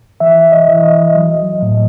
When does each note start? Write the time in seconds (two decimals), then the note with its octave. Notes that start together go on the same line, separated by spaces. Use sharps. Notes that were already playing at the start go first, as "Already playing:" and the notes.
0.20 E3 E5
0.52 D#5
0.68 E3
0.84 D#5
1.15 F#3
1.62 A2